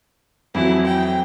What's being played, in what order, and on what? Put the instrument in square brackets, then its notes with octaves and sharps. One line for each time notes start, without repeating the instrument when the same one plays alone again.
[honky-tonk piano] F2 E3 F#3 [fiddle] E4
[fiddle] G5